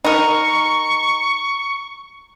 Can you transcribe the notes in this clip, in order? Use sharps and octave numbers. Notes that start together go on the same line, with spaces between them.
D#4 A#4 C#6